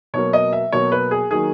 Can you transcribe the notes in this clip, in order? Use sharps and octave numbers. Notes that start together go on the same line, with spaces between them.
B2 F#3 A#3 C#5
D#5
E5
B2 F#3 A#3 C#5
B4
G#4
D#3 F#3 A#3 G#4